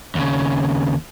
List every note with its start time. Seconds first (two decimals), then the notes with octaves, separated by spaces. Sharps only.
0.15 D#2 C#3